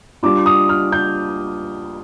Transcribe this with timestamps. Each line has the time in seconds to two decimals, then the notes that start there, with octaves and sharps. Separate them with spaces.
0.23 G3 D4 F4 D6
0.46 D#6
0.69 F6
0.92 G6